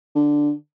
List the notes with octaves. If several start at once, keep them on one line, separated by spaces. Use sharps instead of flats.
D3